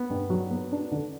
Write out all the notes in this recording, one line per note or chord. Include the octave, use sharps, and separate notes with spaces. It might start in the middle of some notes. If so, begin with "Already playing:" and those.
Already playing: B3
G2
F#3
B3
D4
D3